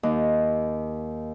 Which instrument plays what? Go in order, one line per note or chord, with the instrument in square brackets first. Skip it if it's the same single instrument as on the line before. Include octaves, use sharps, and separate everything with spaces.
[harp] D#2